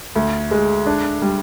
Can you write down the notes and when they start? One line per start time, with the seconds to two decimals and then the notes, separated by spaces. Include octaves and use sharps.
0.16 D2
0.51 G#3
0.86 D4
1.22 G3